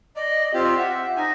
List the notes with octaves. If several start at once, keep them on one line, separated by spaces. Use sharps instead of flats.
D5 D#5
C4 F4 G4
E5 F#5
D#4 G#5